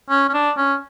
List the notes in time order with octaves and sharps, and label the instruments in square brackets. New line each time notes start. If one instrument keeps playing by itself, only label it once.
[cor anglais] C#4
C#4
D4
C#4